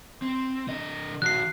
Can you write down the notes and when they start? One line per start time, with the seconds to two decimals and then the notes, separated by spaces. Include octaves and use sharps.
0.22 C4
0.68 D3 D#5
1.22 D#3 F#4 F#6 C7